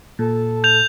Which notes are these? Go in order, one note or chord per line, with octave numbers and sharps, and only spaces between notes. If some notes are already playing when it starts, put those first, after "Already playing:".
A#2 A4
G6 F7